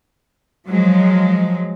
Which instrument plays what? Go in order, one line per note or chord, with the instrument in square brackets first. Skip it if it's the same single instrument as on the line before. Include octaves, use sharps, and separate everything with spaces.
[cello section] F3 F#3 G#3